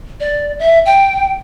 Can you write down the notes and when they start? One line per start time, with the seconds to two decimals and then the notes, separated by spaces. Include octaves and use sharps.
0.20 D5
0.59 E5
0.85 G5